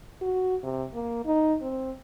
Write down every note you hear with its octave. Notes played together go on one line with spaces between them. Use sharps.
F#4
C3
A#3
D#4
C4